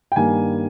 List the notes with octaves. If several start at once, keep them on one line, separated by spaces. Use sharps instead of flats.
G5
G2 D#3 G3 A#3 G#5